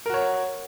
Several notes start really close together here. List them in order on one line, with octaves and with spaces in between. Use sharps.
A#4 F#4 C#5